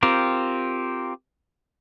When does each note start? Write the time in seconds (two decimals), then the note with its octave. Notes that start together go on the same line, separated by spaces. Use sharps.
0.03 C4 F4 G4 A#4